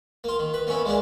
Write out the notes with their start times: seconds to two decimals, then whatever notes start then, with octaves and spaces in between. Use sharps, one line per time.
0.24 A#3 F4
0.39 D#3
0.54 B4
0.67 A#3 B3 C#4 E4
0.85 G#3 A#3 D4 G#4